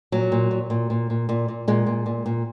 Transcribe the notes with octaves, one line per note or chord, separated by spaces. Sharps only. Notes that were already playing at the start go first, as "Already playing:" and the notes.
A#2 F#3
A#2
A#2
A#2
A#2
A#2
A#2
A#2
A#2 G#3
A#2
A#2
A#2